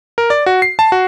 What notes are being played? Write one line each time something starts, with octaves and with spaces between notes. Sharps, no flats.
A#4
D5
F#4
C7
A5
F#4